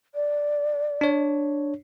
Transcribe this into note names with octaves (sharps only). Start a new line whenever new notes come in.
D5
D4 C#5